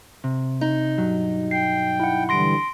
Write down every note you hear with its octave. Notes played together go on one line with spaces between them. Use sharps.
C3
D#4
B1 G2 F#3
G5 C7
E4 F#5
D3 E3 G3 C6 A#6 D7